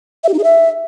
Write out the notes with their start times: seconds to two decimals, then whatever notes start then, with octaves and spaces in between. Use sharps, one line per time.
0.24 E5
0.29 G4
0.34 D#4
0.39 G#4
0.44 E5